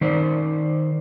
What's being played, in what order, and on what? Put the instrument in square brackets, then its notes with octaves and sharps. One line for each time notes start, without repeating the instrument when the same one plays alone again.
[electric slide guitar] D#3 C5 D5